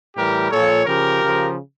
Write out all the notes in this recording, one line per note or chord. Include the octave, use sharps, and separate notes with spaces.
A2 E3 G3 G4 A#4
A#2 F3 A4 C#5
C#3 F3 G4 A#4
C#3 F3